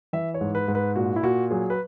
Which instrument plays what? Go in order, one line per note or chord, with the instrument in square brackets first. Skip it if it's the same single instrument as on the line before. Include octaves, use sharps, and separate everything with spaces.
[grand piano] E3 E5
C#5
G#2
B4
G#2
B4
A#2 F#4
E4
A#2 F#4
F#3 G#4
B4